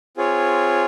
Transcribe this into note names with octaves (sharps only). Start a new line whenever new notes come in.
C4 F4 G#4 C#5